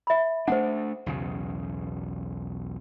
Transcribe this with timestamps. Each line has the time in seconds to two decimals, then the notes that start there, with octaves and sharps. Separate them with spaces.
0.07 E5 B5
0.48 A3 B3 D4 C5 F#5
1.06 B1 E2 C#3